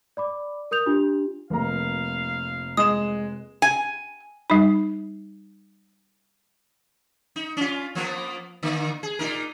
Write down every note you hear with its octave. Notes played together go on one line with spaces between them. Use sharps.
D5 B5 D6
A#4 D#6 G6 F7
D4 F4 G4
F1 A#3 F5 A#5
G#3 D#6 E7
G#5
G3 D#4
D#4
C#4 F4
F3 A#3 B3
D3 A#3
G#4
A#2 D#4 A#4